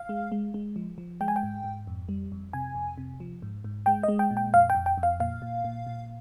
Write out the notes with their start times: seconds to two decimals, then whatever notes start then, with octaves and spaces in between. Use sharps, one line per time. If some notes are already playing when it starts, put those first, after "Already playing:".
Already playing: F5
0.09 G#3
0.32 G#3
0.54 G#3
0.76 F3
0.98 F3
1.21 G#3 G5
1.28 G#5
1.36 G5
1.43 G#2
1.64 G#2
1.87 F2
2.09 G3
2.32 F2
2.53 C3 G#5
2.75 F2
2.98 C3
3.20 F3
3.42 G#2
3.64 G#2
3.86 G#3 G5
4.03 D#5
4.08 G#3
4.19 G5
4.31 A#2
4.37 G5
4.54 F2 F5
4.70 G5
4.75 F2
4.86 G5
4.98 F2
5.03 F5
5.20 A#2 F5
5.42 A#2
5.64 A#2
5.87 A#2